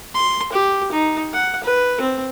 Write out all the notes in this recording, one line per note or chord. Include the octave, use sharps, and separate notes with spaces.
C6
G4
D#4
F#5
B4
C4